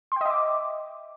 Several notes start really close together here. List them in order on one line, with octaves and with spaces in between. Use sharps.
C6 G5 D#5 E5 D6